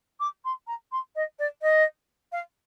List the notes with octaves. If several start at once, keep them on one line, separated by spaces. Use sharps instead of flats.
D6
C6
A#5
C6
D#5
D5
D#5
F5